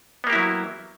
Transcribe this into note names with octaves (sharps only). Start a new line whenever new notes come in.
F#3 A#3 B3 E4 G4